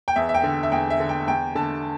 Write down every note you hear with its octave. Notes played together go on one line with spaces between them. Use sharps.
G5
E2 E5
E5
G5
D3
E5
E2 G5
E5
D3
G5
E2 G5
D3 A5